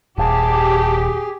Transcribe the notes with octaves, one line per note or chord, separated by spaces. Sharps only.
D#1 G4 G#4 A5